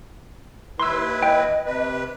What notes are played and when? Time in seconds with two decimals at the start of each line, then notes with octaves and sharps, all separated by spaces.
0.80 D#2 E4 B4 C6 E6
1.23 D#5 G5
1.66 C3 B4